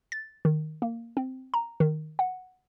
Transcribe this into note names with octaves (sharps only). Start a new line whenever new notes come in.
A6
D#3
A#3
C4
A#5
D#3
F#5